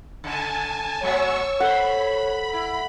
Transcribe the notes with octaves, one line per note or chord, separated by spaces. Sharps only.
C#3 G#5 A5
A#2 F#3 G#3 C#5 C#6 E6
A4 C5 F#5 B5
E4